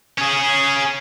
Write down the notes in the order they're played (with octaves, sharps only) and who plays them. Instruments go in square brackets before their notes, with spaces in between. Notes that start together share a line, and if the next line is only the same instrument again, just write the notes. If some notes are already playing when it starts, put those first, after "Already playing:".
[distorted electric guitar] C#4 G#4